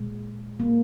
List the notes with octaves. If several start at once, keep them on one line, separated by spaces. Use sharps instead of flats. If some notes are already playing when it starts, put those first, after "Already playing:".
Already playing: A#2 G#3
A#3